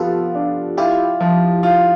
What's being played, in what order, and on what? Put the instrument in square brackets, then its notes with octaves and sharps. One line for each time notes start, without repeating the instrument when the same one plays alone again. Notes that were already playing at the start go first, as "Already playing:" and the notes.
Already playing: [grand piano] F3 B3 [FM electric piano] F4 G4 A4
[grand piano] D4
[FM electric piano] E4 G4 [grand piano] F4
[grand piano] F3
F4